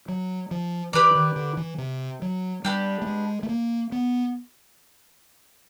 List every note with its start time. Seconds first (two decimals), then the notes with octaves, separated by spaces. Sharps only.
0.08 F#3
0.51 F3
0.93 E3 G4 B4 D5
1.15 D#3
1.36 D3
1.57 E3
1.78 C3
2.22 F#3
2.65 G3 B3 D4 G4
3.02 A3
3.07 G#3
3.43 A3
3.49 A#3
3.92 B3